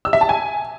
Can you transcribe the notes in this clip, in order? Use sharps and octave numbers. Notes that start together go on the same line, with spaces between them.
E6
E5
A5
G#5